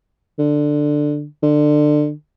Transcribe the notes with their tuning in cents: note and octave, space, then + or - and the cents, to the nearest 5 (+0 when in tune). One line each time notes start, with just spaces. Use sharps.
D3 +10
D3 +25